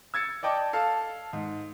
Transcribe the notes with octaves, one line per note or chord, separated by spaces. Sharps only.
E6 G#6 A6 C#7
D5 D#5 G5 A5 D6
A4 F5 A5
G#2